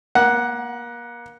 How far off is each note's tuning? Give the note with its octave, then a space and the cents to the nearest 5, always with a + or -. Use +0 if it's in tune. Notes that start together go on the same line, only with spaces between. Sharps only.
A#3 +30 F#5 +0